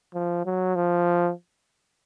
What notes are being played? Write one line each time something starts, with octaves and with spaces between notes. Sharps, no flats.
F3
F#3
F3